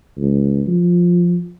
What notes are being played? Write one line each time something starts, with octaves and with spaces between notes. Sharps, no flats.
C#2
F3